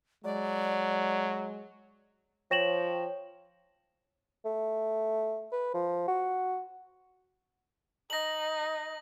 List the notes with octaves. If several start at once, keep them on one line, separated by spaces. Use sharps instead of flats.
F#3 G#3 D5
F3 C#5 G5 A#6 E7 F#7
A3
B4
F3
F#4
D#4 A#6 F#7